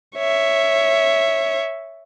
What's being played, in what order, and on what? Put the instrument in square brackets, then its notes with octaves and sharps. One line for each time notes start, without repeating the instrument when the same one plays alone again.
[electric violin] C#5 E5